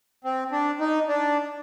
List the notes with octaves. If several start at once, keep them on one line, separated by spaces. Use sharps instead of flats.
C4
D4
D#4
D4